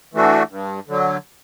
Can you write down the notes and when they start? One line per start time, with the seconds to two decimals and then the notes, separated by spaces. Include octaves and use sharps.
0.14 E3 A3 D4 F#4
0.50 G2
0.88 D3 F#3